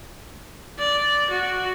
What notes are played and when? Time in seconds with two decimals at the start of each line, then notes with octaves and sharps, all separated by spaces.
0.79 D5
1.30 F#4